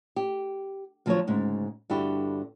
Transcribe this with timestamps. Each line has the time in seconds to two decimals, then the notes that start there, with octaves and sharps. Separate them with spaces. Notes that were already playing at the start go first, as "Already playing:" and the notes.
0.16 G4
1.06 D2 F3 F#3 C4 D4 C#5
1.27 D2 G#2 C#3
1.90 G2 D3 D4 E4 F#4 G4